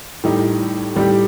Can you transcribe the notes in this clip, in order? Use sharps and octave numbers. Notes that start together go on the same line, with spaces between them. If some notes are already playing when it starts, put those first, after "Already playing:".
A2 G3 D#4 G4
A2 G3 D#4 G4